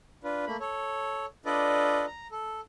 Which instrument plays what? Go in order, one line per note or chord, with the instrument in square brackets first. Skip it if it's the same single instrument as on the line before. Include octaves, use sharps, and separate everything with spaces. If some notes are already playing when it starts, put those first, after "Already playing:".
[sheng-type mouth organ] D4 F4 B4
A3 A#3 B5
A4 C#5
D4 F4 A4 B4 D5 D#5
A#5
A4